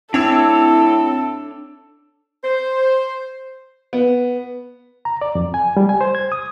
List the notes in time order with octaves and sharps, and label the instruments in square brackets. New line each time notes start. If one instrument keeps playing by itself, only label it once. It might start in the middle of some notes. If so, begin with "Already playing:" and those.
[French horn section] A2 E4 [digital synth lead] C4 [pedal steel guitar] D4 C#5 E6 [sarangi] A4
[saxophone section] C5
[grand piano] B3
[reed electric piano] A#5
D5
F2
G#5
G3
G#5
C5
G#6
D#6